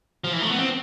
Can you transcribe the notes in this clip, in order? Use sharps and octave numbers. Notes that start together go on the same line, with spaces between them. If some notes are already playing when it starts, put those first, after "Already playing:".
F3
E3
A3
B3
C4